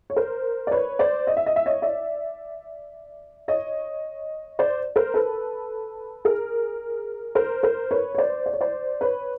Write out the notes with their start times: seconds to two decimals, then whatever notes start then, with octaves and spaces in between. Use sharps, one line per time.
0.10 C#5
0.16 A#4 C5
0.67 D5
0.71 B4 C#5
0.99 C5 D5
1.27 D#5
1.37 E5
1.46 D#5
1.56 E5
1.66 C#5 D#5
1.82 D5 E5
3.48 C#5 D#5
4.59 C5 D5
4.96 A#4 C5
5.14 A4 B4
6.25 G#4 A#4
7.35 A#4 C5
7.63 A#4 C5
7.91 B4 C#5
8.15 C#5
8.18 C5 D5
8.46 D5
8.53 C#5
8.61 C5 D5
9.01 B4 C#5